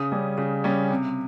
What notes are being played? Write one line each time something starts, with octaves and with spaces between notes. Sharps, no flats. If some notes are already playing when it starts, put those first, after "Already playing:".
Already playing: C#3 D#6
G3 C#4
C#3
G3 C#4
C3